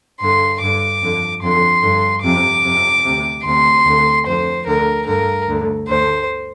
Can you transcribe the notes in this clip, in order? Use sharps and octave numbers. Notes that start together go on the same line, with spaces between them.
G2 D3 C6
G2 D3 D6
F2 D3
F2 D3 C6
G2 D3
F2 C3 D6
F2 C3
D2 C3
D2 C3 C6
D2 D3
F2 D3 C5
D2 D3 A#4
G2 D3 A#4
D2 D3
D2 D3 C5